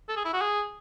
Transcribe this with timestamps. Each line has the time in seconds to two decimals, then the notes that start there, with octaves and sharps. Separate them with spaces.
0.09 A4
0.16 G#4
0.25 E4
0.33 F#4
0.41 G#4